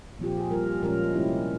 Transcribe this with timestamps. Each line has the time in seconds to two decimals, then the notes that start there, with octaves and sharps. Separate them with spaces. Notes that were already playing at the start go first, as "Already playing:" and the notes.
0.19 A#2 F3 C4 F4 G4
0.37 G#4
0.51 G3 A#3 F4 A#4
0.83 A#2 F3 G#3 C#4 F4 A#4
1.14 C3 G3 C#4 E4 G4